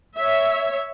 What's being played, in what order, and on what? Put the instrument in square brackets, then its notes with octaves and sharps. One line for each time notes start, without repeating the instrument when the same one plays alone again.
[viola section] C#5 E5